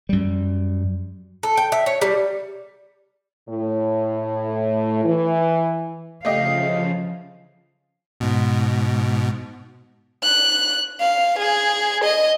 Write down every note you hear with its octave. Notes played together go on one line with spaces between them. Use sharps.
F#2 G3
A4
G5
E5
C#5
G3
A2
E3
C#3 F3 A3 G4 D#5 F5
G#2 B2
F#6
F5
G#4
D#5